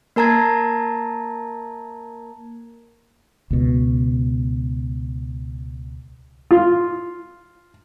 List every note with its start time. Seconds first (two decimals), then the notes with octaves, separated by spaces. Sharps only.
0.16 A#3 A#4 A5 A#5 G#6
3.50 C#2 B2
6.51 F4